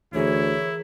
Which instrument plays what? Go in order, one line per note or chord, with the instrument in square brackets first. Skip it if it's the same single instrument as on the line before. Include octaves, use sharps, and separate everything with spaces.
[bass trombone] D2 [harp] E3 G#4 A#4 [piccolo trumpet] E4 [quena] C#5